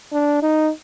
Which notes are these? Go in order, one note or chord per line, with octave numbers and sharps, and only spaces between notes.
D4
D#4